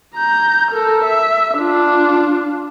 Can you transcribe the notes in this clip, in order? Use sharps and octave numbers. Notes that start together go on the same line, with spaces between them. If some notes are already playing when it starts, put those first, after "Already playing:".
A#5 G6
A4 A#4
E5
D4 F4